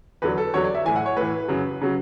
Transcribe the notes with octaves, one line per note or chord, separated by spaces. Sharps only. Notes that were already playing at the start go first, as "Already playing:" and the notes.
E2 D3 F#3 B4
A4
E2 D3 F#3 C#5
D5
E5
A2 E3 G#5
F#5
C#5
A2 E3 B4
F#2 C#3 F#3
C#3 F#3